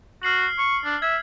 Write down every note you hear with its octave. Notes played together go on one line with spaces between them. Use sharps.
F#4 F6 C7 F#7
C#6
D4
E5 G#6